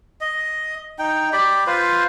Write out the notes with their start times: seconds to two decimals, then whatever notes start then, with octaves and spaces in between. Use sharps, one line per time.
0.21 D#5
0.99 D#4 G5
1.33 G4 D5 B5
1.67 F4 B4 C5